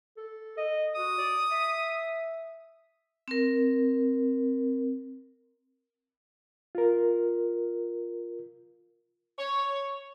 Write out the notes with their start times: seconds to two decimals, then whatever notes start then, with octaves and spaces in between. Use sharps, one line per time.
0.17 A4
0.57 D#5
0.95 F#4 D#6
1.19 D5
1.51 E5
3.28 C4 A#4
6.75 F4 A#4
9.39 C#5